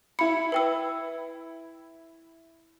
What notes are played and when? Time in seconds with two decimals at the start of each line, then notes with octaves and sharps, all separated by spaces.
0.19 E4 B5 C#7
0.52 B4 G5 E6